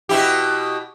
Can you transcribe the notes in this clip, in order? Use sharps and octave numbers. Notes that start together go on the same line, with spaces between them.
B2 E4 G4